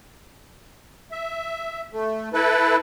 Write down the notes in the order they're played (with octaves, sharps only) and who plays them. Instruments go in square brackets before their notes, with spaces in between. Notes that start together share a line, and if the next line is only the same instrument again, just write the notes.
[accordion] E5
A3
E4 A4 B4